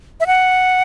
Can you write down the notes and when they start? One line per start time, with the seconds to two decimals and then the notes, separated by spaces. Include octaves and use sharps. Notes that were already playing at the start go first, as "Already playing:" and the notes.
0.20 E5
0.27 F#5